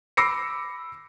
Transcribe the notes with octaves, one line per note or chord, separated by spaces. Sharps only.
B5 D6 E6 A#6 C7 C#7